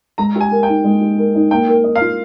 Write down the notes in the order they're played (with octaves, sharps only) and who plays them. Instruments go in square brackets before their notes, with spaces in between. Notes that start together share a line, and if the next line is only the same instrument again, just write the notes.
[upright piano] G#3 [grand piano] A#5
[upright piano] G4
[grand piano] G#5
[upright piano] A#4
[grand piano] G5
[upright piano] D#4
G#3
G4
A#4
D#4
[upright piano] A#3 [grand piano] G5
[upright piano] A#4
D#5
[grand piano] F5
[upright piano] F4